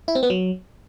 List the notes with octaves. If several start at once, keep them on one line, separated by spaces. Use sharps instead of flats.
E4
C4
B3
F#3